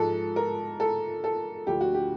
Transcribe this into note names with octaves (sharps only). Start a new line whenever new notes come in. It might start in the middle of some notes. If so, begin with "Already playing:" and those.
Already playing: G#2 F3 G#3 A4
A#4
A4
A4
D2 D3 F3 G4
F#4
G4